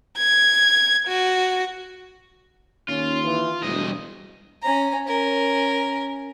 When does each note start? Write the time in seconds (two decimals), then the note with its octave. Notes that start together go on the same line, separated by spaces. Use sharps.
0.17 G#6
1.08 F#4
2.88 D#2 C#4 F4
3.23 E3
3.63 E1 D2 G2 D#5
4.62 C#4 A#5
5.07 C#4 A#4